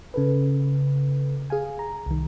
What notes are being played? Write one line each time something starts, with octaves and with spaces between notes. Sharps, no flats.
C#3 A4 B4
G#4 F5 G#5
A#5
C2 D#3